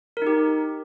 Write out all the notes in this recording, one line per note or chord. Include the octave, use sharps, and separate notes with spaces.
D#4 G4 A#4